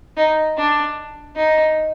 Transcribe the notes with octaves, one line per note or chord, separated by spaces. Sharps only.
D#4
D4
D#4